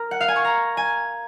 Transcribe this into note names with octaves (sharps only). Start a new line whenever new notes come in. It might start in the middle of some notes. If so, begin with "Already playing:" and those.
Already playing: A#4
F#5
F5
G#5
C#6
A#5
G#5